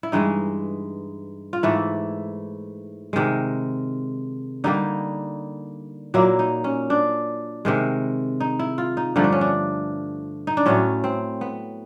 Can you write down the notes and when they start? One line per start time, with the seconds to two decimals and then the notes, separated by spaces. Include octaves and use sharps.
0.03 E4
0.12 G2 E3 G#3 D#4
1.53 F4
1.63 G#2 E3 A3 E4
3.13 C3 D#3 G#3
4.64 D3 G3 A#3 D#4
6.14 A#2 F#3 A#3 E4
6.39 D#4
6.64 C#4
6.90 D4
7.65 C3 D#3 G#3
8.40 D#4
8.59 E4
8.78 F4
8.97 D#4
9.16 G2 D3 F3 A3 D#4
9.24 D4
9.32 C#4
9.41 D4
10.47 D#4
10.57 D4
10.66 A2 F#3 A3 C#4
11.04 C4
11.41 B3